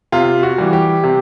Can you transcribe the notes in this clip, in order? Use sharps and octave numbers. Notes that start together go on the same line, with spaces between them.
C3 F4
F#4
E3 G3
G4
C3